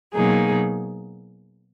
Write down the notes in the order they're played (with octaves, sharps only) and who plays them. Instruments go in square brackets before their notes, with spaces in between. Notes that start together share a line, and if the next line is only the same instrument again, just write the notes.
[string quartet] B2 F#3 A#3 D#4 G#4